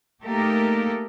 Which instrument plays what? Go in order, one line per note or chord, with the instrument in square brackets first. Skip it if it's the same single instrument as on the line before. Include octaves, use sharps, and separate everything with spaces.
[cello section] A3 A#3 D#4 G4 A4 A#4